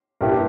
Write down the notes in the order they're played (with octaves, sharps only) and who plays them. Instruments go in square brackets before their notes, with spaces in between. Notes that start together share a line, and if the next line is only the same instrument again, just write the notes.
[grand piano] G2 G3 A#3 E4 G4